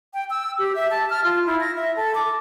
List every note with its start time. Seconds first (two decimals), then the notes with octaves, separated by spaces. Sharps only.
0.14 G5
0.30 E6
0.59 G4
0.75 E5
0.91 A5
1.10 F6
1.24 F4
1.46 E4
1.61 A#6
1.75 E5
1.96 A4
2.15 D6